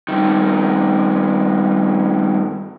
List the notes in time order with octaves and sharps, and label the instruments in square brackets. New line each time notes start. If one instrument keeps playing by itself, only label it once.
[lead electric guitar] G2 D#3